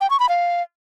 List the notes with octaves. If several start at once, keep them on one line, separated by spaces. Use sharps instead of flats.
G5
C#6
B5
F5